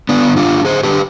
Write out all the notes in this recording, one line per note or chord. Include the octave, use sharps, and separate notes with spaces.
D3 B3 D4
G2
D4 F4
D3
D3 G#4 C5
D3 G4 B4